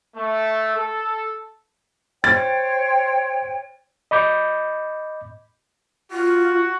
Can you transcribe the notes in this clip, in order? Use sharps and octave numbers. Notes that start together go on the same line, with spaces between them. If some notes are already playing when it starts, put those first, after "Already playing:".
A3
A4
C5 C#5 G5 A6
D#5 B5 D6 G6
F4 F#4